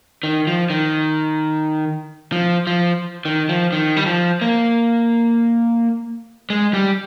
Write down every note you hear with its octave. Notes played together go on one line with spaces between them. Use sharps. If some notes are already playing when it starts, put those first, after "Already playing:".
D#3
F3
D#3
F3
F3
D#3
F3
D#3
G3
F3
A#3
G#3
G3